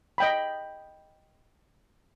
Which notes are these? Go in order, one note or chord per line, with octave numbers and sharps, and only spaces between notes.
D#5 G5 B5